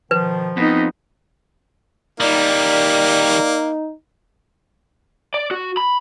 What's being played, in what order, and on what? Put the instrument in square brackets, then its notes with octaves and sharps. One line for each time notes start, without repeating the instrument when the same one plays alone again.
[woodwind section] B2 D#3 F3 [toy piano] B4
[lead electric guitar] F2 [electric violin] B3 D#4
[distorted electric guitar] D#3 G3 [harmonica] A#3 [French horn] D#4 [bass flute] D5
[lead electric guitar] D5
F#4
B5